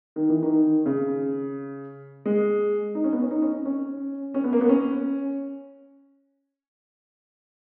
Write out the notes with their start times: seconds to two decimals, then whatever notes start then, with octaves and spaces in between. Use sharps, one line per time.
0.16 D#3
0.29 E3
0.43 D#3
0.86 C#3
2.25 G#3
2.95 D#4
3.04 C#4
3.13 B3
3.22 C#4
3.31 D#4
3.42 C#4
3.65 C#4
4.34 C#4
4.44 B3
4.53 A#3
4.61 B3
4.69 C#4